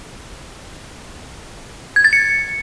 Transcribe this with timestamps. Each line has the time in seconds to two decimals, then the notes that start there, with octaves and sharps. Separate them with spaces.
1.96 G#6
2.04 A6
2.13 C#7